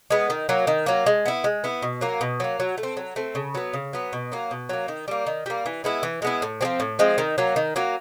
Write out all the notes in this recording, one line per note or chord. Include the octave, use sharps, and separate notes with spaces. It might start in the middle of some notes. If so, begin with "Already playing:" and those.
G#3 B3
D#3
F#3 A#3
D#3
F#3 A#3
G#3
B3 E4
G#3
B3 E4
B2
F#3 A#3
B2
F#3 A#3
F#3
A3
C4
F#3
A3 C4
C#3
F#3 B3
C#3
F#3 B3
B2
F#3 A#3
B2
F#3 A#3
D#3
G3 A#3
D#3
G3 A#3
E3
G#3 B3 E4
E3
G#3 B3 E4
A2
F3 G#3 C4
A2
F3 G#3 C4
D#3
F#3 A#3
D#3
F#3 A#3